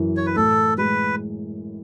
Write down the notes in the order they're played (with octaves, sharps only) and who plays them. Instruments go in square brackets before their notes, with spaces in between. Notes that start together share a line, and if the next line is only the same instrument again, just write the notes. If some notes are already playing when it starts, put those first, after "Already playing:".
Already playing: [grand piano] F#2 E3
[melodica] C#5
B4
[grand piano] A2 [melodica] A4
[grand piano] G#3 [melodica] B4